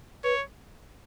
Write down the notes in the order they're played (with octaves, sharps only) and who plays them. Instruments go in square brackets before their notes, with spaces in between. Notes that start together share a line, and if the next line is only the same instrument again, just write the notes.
[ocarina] B4 [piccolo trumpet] C#5